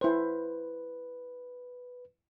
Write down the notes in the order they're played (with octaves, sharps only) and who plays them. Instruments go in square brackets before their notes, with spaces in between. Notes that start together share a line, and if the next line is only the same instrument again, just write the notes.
[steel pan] E4 C5 [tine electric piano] B4